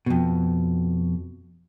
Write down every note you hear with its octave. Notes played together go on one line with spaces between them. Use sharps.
F2 B2